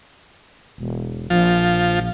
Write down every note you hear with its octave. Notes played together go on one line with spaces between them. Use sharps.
E1
A#1 F3